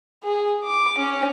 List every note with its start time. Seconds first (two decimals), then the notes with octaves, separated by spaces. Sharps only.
0.24 G#4
0.64 D6
0.98 C#4